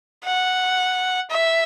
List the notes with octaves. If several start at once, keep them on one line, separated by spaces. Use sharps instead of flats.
F#5
E5